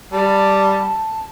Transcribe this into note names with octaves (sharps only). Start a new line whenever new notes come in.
G3 A5